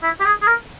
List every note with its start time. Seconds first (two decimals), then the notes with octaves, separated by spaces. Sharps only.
0.03 E4
0.20 G4
0.25 G#4
0.42 G#4
0.47 A#4